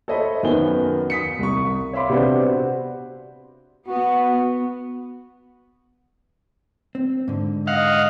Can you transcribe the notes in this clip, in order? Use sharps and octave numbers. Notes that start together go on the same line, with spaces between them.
A4 C5 C#5 D#5 E5 B5
F#2 D#3 B3 G#5 G7
D#6 B6 C#7
C2 C#6
C#5 E5 F5 B5 C6 D6
C3 B3 D4 F#4 C5
B3 F#4
C4
G#2 D3
D#5 F5 F#5